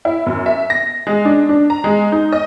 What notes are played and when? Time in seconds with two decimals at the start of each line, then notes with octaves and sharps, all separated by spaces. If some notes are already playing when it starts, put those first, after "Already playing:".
0.05 E4
0.26 F#2
0.46 E5
0.70 A#6
1.07 G#3
1.25 D4
1.49 D4
1.70 A#5
1.84 G#3
2.12 D#4
2.32 D#5